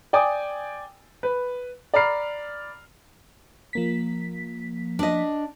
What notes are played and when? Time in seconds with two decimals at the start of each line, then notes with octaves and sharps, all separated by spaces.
0.13 D5 G5 G#5 D6 D#6
1.23 B4
1.94 D5 A#5 B5 F6 C7
3.73 F3 A#3 B6
4.99 D4 D#5